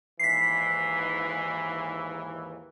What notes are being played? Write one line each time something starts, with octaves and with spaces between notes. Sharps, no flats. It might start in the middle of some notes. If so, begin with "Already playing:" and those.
D#2 G#2 E3 B6 C7